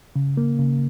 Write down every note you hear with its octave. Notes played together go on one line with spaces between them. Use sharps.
C#3
A#3
C#3